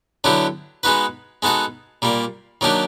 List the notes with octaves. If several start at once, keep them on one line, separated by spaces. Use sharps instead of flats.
D3 F#3 B3 E4 G4
G#3 B3 D#4 F#4 B4
G#3 B3 D#4 F#4 A4
A#2 G3 A#3
D#3 F#3 A#3 D4 G4